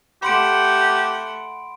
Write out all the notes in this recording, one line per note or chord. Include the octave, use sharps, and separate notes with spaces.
A3 G4 F#5 B5 C6 D7